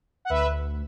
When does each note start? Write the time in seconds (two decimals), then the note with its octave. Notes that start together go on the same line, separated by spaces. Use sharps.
0.25 F#5
0.30 D2 B4 E5